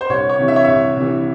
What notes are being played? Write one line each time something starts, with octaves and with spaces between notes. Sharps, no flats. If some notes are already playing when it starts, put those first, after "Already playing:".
C5
C2 C#5
C#5
C3 E3
E5
C#5
C2 E5
C3 E3